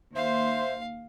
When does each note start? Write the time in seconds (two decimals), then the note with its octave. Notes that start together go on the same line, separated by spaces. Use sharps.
0.16 D#2 C5 E5 F5